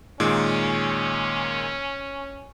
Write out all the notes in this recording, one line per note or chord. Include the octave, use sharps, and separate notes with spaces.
A#2 D#3 G#3 C#4